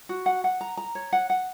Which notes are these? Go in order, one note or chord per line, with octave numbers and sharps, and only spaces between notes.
F#4
F#5
F#5
A#5
A#5
C#5
F#5
F#5